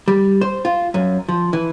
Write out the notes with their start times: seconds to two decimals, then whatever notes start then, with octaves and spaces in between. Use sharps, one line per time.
0.08 G3
0.41 C5
0.65 F4
0.94 F#2
1.29 F3
1.53 E3